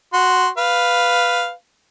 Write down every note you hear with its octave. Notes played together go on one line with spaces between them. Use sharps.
F#4 C6
B4 F5